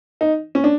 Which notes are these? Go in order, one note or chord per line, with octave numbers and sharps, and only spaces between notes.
D#4
C#4
D4